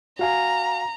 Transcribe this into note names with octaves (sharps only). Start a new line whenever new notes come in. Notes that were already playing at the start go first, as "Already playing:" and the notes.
F#4 F5 G#5 A#5